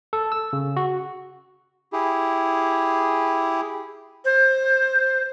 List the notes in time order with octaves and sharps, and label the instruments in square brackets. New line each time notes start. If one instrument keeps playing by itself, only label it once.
[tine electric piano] A4
E6
C#3
F#4
[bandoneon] E4 G4 G#4
[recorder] C5